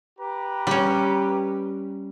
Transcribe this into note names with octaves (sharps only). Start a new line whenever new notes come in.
G4 B4 A#5
G3 C#4